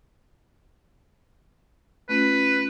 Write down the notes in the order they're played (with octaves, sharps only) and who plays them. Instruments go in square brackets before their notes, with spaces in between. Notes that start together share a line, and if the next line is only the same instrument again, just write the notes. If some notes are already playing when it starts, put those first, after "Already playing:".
[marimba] A3 C#4 F4 [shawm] B4